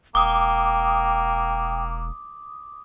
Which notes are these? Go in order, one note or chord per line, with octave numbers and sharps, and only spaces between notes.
E1 A#3 G5 D6 D#6